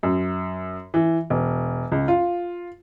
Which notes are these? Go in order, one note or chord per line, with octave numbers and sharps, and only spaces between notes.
F#2
E3
E1
C#2
F4